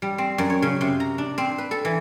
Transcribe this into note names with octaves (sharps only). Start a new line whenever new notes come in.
G3
C4
F#2
C#5
C#3
C3
A#5
D4
C4
B4
A4
E3